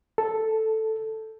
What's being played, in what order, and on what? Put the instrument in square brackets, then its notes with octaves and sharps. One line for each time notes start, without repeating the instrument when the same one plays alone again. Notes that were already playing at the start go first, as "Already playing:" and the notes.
[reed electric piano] A4